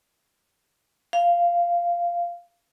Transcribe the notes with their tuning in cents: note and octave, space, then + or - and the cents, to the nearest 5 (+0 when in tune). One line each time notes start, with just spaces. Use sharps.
F5 -10